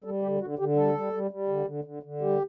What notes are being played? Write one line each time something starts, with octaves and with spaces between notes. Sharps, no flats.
G3 A4
D3 G4
D3 F#4
D3 G4
G3 A4
G3
G3
G3
D3
D3
D3
D3
G3 G4